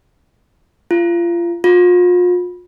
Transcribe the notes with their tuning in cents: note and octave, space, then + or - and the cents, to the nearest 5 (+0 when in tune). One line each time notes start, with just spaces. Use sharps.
F4 -30
F4 +40